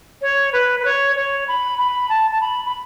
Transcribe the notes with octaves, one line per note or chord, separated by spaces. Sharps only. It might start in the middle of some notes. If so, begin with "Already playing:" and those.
C#5
B4
B4
C#5
C#5
B5
B5
A5
A5
B5
B5